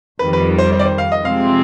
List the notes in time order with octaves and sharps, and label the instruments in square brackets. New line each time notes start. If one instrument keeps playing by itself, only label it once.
[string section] F2 D#3 G3 [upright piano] B4
[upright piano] B4
C5
C5
D5
C5
F5
D#5
[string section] C3 F3 G#3 C4 [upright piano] F5